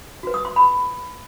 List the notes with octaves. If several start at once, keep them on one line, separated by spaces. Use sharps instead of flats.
F#4 B4
D#6
C6
B5